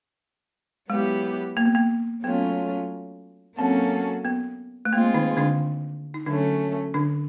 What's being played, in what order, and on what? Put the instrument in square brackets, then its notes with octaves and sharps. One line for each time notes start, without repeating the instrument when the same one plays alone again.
[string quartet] F#3 B3 E4 G4 [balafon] G#3
[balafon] A#3
B3
A#3
[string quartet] F#3 A3 C#4 F4 [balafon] B3
[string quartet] F#3 A#3 C#4 F#4 A4 [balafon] C4
[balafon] B3
A3
[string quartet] G#3 C4 F4 G#4 [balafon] A#3
[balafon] D#3 D#4
D3 D4
D#4
[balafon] D3 D4 [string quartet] F#3 A3 C#4
[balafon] D3 D4